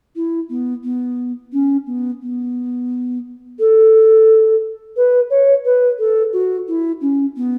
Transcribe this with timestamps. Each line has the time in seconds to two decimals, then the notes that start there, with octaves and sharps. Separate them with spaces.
0.16 E4
0.50 B3
0.84 B3
1.53 C#4
1.87 B3
2.22 B3
3.59 A4
4.97 B4
5.30 C#5
5.65 B4
5.99 A4
6.33 F#4
6.68 E4
7.01 C#4
7.37 B3